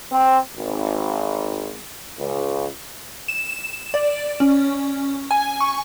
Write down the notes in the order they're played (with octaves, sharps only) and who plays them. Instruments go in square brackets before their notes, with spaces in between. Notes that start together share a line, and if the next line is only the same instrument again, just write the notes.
[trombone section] C4
G#1
C#2
[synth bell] E7
D5
C#4
G#5
C#6